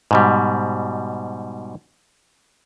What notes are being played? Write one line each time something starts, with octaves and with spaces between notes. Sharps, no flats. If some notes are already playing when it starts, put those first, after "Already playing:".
G#2 B2 G3